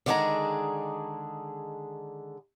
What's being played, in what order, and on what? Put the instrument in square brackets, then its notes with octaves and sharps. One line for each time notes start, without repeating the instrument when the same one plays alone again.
[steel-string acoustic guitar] D3 D#3 G#3 D4 G#4 A#5